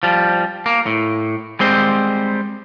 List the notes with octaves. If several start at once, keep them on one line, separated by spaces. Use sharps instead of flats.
F3 G3
A#3
A2
G3 G#3 C4 C5